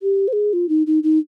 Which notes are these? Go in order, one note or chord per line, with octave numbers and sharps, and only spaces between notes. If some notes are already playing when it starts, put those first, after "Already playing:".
G4
C5
G#4
F4
D#4
D#4
D#4